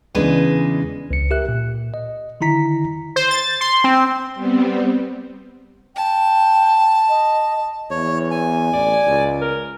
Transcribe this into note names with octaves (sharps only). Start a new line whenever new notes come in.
E2 C#3 G#3 D4 B4
C#2 C#7
G4 A#4 E5 F#6
A#2
D#5
D3 D#3 E4 A#5 B6
C5
A6
C6
C4
G3 B3 C4
G5 A5
D#5
E2 C#5
G#5
A1 D5
C#2
A#4